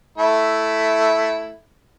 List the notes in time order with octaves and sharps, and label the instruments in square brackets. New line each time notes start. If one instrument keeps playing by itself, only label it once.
[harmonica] A3 E4